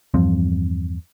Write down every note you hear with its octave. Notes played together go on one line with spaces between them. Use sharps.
E2 G2 F3 C4